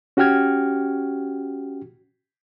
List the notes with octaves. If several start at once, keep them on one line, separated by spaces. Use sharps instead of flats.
C#4 F#4 G4 G5 F6 G#6